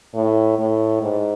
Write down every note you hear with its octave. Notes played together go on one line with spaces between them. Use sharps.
A2
A2
G#2